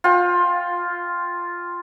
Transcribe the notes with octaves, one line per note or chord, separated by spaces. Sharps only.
F4 G5